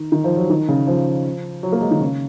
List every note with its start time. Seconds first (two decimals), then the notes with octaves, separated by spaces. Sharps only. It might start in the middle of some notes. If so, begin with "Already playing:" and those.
Already playing: D#3
0.12 D#3
0.24 F3
0.37 F#3
0.50 D#3
0.68 C#3
0.87 F3
1.63 F#3
1.72 A#3
1.82 G#3
1.91 D#3
2.01 C#3